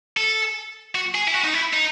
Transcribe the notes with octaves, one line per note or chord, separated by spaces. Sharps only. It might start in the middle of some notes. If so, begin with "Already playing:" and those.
A4
F#4
G#4
E4
F#4
D#4
E4
D#4